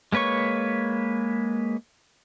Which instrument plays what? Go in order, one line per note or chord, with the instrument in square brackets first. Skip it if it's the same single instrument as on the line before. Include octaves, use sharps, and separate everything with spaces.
[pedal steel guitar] G#3 A#3 B4 C#5 C#6